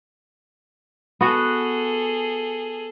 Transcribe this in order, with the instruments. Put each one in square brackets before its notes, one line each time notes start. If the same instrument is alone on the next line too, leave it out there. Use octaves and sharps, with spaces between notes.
[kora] B3 F#4 [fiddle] G#4 A4